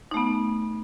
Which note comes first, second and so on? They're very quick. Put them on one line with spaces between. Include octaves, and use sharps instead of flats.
D#4 A3 B3